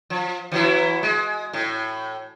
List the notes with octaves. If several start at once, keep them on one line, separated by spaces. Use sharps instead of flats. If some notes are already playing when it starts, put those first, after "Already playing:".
F3
E3 F#3 E4
G#3
A2